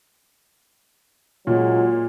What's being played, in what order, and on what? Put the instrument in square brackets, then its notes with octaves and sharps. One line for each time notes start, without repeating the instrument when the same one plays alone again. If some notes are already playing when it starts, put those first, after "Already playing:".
[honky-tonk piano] A#2 [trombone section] C#3 F#3 G#3